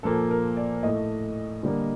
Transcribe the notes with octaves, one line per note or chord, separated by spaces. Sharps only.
A#2 F3 A#3 A4
A#4
D5
A2 A3 D#5
D3 G3 A#3